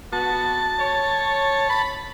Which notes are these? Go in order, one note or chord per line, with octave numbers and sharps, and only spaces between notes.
B3 F#4 A5
C#5
B5